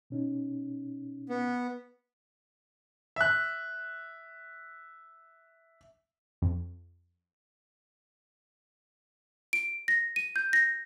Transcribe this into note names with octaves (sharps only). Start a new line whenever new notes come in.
B2 C#4 D#4
B3
E5 F#6
F2
D7
A#6
D#7
G6
A#6